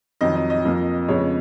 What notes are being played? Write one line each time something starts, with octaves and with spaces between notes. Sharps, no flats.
F2 D#3 F#3 D#5
D#5
D#5
F2 F3 A#3
F2 C#3 G#3 B3 C#5